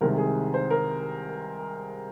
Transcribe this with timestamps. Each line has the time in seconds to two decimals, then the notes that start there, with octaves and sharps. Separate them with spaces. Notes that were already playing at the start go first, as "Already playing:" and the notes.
0.01 C2 C3 D#3 G#3 A#4
0.18 G#4
0.54 C5
0.70 A#4